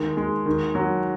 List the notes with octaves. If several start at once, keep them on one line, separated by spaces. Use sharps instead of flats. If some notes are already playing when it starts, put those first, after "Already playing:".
Already playing: D#3 G#3
G#3
D#3
F#3